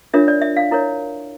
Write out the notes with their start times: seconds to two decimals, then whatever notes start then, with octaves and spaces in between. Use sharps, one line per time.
0.14 D4 F4 A#4 C#5 E5
0.28 D5
0.41 E5
0.57 F5
0.71 E4 A#4 C#5